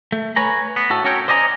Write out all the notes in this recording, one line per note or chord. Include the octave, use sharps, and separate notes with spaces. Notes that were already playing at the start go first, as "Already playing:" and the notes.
A3
B4 C#5 G#5 A#5
B3
A2 F#4 A4
C#4 F#4 A4 A#4 C#5 G5
C5 D5 D#5 G#5 A#5